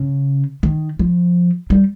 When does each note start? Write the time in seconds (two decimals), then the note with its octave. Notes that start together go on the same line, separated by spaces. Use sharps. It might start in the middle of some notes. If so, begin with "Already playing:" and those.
Already playing: C#3
0.63 D#3
0.99 F3
1.70 G3